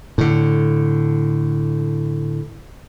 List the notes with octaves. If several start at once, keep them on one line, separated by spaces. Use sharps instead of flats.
A2 D3